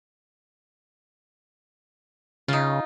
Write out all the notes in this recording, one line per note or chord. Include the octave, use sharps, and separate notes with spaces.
C#3 D#4 F4